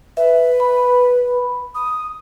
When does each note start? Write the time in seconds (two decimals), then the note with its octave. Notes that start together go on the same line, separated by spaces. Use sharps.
0.17 B4 E5
0.60 B5
1.75 D#6